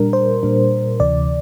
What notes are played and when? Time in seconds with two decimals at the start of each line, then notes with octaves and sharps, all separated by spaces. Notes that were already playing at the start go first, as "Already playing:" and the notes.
Already playing: A#2 G3 D4 A#4
0.13 C5
0.43 A#2 G3 D4
1.00 D2 C3 E3 D5